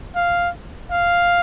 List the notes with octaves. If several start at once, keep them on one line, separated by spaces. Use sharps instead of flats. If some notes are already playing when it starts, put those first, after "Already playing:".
F5
F5